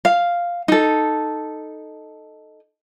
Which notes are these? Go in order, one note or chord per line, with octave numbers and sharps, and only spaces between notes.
F5
D#4 A4